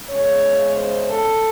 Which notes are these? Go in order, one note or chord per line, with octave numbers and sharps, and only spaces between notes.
E2 C#3 G#3 C#4 C#5
C5
A4